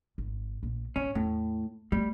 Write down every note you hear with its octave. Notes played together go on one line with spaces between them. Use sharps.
G#1
A#1
G#1 C#4
E2 A2
G3 A3 C4